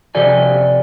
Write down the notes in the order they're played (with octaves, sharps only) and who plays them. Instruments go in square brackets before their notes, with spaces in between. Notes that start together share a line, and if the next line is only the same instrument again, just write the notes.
[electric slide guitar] C3 F3 G4 A4 D5 G#5